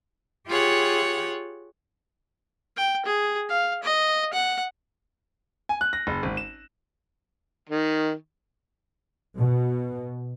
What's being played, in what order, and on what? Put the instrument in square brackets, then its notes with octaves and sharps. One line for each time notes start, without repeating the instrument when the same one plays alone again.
[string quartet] F4 G4 G#4 C#5 F#5
[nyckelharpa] G5
G#4
F5
D#5
F#5
[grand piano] G#5
F#6
A#6
F#1
G#1
E7
[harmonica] D#3
[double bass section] B2